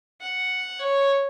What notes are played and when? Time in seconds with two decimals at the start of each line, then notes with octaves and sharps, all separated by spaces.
0.21 F#5
0.79 C#5